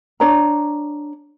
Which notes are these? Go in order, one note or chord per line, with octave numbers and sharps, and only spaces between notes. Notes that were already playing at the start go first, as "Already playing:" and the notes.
D4 C#5 A#5